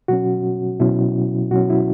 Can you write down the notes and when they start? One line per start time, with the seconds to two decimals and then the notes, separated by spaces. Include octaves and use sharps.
0.08 B2 F#3 C#4 F#4
0.80 B2 F#3 C#4 E4
1.51 B2 F#3 C#4 F#4
1.70 E4